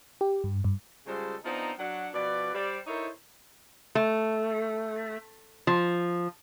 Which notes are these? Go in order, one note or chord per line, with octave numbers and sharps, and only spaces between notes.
G4
G2
G2
C#3 G3 G#3 F4 A4 C5
F3 B3 C4 D4 D#4
F#3 D4 F#5
B2 F3 B4 D5
G3 C5 D5
D#4 E4 A4 A#4 C5 C#5
A3
F3